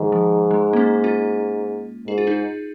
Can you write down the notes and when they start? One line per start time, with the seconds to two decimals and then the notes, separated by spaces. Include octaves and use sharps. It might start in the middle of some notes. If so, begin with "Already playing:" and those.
Already playing: G#2 D#3 F3
0.12 F3
0.51 G#3
0.73 A#3
0.77 C#4
1.04 C#4 F4
2.07 G#2 G#4
2.18 F4
2.27 D#4 G#4